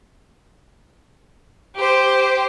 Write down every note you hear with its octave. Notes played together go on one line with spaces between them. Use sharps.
G4 C5